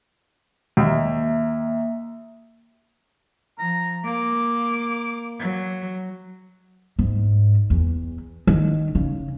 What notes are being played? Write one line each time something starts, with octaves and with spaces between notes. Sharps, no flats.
D#2 A#3 E5
F3 A#5
A#3 D6
F#3
G#2
E2
D#3
C#3